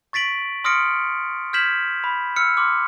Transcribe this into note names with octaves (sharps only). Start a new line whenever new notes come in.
C#6 A6 B6 D7 F#7
C6 D#6 F6 A#6 C#7 D7
F6 G6 G#6 B6 E7 F#7
B5
E6 F6 C#7
C6 D6 F6